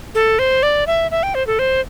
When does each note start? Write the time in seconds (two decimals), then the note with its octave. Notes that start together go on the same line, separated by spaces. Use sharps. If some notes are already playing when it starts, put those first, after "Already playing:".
0.15 A4
0.39 C5
0.63 D5
0.87 E5
1.11 E5
1.23 G5
1.35 C5
1.47 A4
1.59 C5